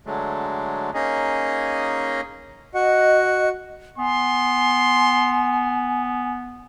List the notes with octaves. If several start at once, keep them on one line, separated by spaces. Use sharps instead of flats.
D3 F#3 G#3 A3
A#3 C#4 D#4 G#4 D#5
F#4 D#5 F#5
B3 G#5 C6